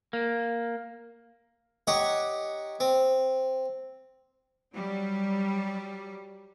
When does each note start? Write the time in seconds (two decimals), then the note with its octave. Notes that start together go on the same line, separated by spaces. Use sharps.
0.13 A#3
1.87 D#4 G4 C#5 F#5 C#6
2.80 C4
4.75 F#3 G3